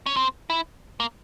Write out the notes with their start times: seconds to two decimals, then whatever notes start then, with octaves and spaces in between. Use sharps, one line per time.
0.06 C#4
0.16 C4
0.50 E4
1.00 A#3